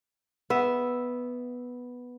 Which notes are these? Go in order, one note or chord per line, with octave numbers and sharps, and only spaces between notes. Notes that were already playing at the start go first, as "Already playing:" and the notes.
B3 E5